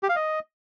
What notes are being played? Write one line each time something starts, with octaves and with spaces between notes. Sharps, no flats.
G4
F5
D#5